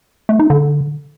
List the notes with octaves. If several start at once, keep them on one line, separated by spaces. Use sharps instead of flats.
A3
D#4
D3